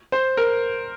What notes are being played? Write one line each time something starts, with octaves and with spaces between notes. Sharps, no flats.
C5
A#4